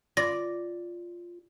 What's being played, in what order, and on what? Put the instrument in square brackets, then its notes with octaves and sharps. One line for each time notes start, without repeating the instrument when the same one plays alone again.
[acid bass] F4 [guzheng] D5 [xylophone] A#6